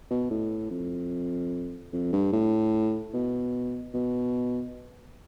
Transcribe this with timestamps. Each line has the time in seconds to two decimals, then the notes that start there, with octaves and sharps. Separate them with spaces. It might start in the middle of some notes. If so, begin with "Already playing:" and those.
0.11 B2
0.30 A2
0.71 F2
1.93 F2
2.13 G2
2.33 A2
3.14 B2
3.94 B2